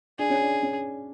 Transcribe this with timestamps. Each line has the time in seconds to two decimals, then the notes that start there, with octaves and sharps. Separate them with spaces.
0.19 D4 G#4
0.30 C#4
0.42 D4
0.63 C#4